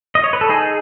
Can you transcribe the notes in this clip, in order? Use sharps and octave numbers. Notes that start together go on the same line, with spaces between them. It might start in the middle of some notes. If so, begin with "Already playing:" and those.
D#5
C#5
B4
A4
D#4 G#4